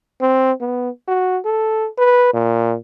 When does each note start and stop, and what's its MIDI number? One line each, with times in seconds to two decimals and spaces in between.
0.21 0.52 60
0.61 0.90 59
1.08 1.38 66
1.45 1.88 69
1.98 2.31 71
2.33 2.76 46